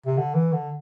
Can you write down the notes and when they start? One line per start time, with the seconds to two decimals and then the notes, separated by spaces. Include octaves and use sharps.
0.06 C3
0.18 D3
0.35 E3
0.53 D3